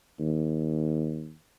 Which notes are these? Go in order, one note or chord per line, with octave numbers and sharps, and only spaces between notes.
D#2